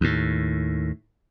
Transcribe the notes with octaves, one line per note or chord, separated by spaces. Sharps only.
D#2 A2